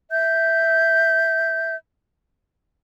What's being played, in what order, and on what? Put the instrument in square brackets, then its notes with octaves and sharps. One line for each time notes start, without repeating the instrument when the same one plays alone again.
[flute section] E5 G6